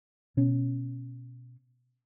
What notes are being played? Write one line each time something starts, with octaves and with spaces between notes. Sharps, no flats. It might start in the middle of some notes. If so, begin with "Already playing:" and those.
B2 C#4